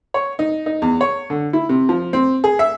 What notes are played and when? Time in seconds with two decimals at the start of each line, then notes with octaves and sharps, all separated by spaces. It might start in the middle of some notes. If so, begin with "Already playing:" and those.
0.14 C#5
0.39 D#4
0.66 D#4
0.82 E2
1.01 C#5
1.30 D3
1.53 E4
1.69 C3
1.89 F3
2.13 C4
2.44 G#4
2.59 E5